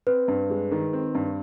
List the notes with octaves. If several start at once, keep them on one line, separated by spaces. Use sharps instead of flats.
C4 B4
G2
G#3
D#3
C4
G2